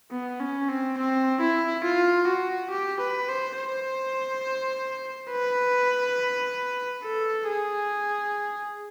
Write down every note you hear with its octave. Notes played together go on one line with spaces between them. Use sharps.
B3
C#4
C4
C4
E4
F4
F#4
G4
B4
C5
C5
B4
A4
G#4